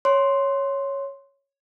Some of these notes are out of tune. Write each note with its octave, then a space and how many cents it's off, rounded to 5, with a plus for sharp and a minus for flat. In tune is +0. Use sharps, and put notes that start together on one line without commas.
C#5 +0 C6 +0